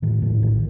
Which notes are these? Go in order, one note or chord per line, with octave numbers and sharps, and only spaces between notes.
A2 D#3
A2 F3
A#1 D#3